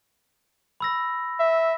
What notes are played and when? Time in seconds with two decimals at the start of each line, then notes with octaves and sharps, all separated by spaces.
0.80 B5 E6 A#6
1.40 E5